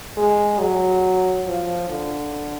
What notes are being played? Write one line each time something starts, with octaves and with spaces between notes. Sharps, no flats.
G#3
F#3
F3
D3